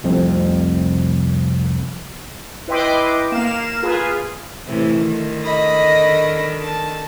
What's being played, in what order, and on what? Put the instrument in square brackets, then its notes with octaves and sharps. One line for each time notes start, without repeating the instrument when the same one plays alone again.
[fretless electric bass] F1 C2 F2 C4
[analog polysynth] E4 B4 D#5 G5 C6 D6
A#3 F5 E7
F4 G#4 B4
[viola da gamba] A2 C3 E3
D3 D#3
[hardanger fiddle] D#5 B5
A5